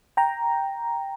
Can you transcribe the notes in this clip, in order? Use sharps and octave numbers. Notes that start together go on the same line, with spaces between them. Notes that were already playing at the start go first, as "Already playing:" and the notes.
G5 A#5